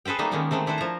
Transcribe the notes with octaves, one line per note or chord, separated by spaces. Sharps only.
G#4 A4 B4 C5 G5
G3 A3 A#3 D#4 A4
D#3 G#3 A#3 B3 C#4
D#3 G#3 A3 C4
D4 E4 A4 B4 C5
F3 A#5